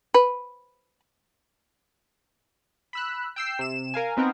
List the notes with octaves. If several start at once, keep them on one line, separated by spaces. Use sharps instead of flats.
B4
B5 E6 F#6
G5 E6 C7
C3 E7
A#4 F5 G#5
B3 C4 D#4 A#4 B4